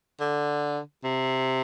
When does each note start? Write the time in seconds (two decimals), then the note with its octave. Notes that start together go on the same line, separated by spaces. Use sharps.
0.20 D3
1.04 C3